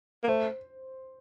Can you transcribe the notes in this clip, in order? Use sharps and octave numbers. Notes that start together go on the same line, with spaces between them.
A#3
A3 C5